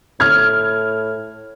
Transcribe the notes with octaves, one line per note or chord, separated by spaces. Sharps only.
A2 F6 G#6